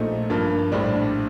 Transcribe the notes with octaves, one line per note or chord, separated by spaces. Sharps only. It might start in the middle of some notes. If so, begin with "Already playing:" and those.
Already playing: A#1 A#2 A3 D#4
G2 F3 A#3
A#1 A2 G3 D4